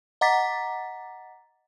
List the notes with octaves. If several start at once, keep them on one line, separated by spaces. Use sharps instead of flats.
D#5 F#5 A#5 D6 A6 B6